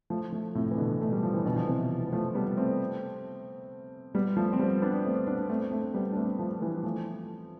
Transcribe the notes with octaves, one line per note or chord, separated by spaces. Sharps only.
F3 A3
F3 A3
A2 C3
E3
B2 D3
A3
G3
F3
E3
B2 D3
F3
C3 E3
B3
F3 A3
G3 B3
A3 C4
G3 B3
F3 A3
C4
G3 B3
B3 D4
A3 C4
B3 D4
A3 C4
A3 C4
G3 B3
D4
A3 C4
F3 A3
E3 G3
F3 A3